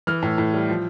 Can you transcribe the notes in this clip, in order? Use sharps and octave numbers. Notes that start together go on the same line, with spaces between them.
E3 F6
A2
A2
G3
F3